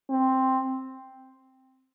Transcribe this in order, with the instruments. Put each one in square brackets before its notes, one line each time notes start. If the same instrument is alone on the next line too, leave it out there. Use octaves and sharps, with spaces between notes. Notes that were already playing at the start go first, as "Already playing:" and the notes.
[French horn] C4